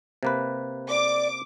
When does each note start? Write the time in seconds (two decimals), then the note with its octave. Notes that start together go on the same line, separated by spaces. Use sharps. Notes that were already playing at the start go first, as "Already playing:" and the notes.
0.23 C3 A#3 B4
0.90 D5 D6